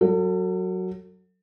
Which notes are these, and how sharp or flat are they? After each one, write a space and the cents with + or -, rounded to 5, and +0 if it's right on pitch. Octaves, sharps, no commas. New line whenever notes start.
F#3 +0 A4 +40